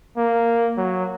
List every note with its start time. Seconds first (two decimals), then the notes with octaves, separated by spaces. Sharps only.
0.17 A#3
0.77 F#3